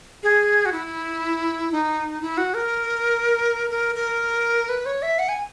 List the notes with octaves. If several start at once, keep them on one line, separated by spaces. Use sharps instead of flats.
G#4
F#4
E4
D#4
E4
F#4
A#4
A#4
A#4
B4
C#5
E5
F#5
G#5